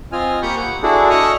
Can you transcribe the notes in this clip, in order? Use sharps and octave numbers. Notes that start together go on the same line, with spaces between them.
C4 F4 D#5 G#5 F6
A#3 G4 B5 C#6 D#6 G6
F#5
D4 E4 F#4 G#4 A4 D5
D#5 E5 C#6 D#6 F6 F#6